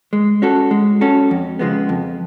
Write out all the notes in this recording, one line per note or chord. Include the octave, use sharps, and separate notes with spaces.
G#3
C#4 F#4 A4
G#3
C#4 F#4 A4
F2
C#3 F3 G#3 B3
F2